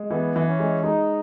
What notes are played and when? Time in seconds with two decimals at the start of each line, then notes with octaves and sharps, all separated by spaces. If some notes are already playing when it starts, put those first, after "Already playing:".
Already playing: G#3
0.11 E3 B3
0.36 E3
0.48 C#4
0.60 G#3
0.84 G#3 D#4